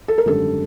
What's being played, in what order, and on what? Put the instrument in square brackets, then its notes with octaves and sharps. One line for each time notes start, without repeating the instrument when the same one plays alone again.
[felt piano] A4
A#4
G#1 F#2 D3 G3 A4